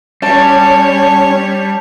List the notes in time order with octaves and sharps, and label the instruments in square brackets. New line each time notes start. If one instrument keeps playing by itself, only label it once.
[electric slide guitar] G3 [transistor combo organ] C#4 [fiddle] C#5 [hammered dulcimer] A5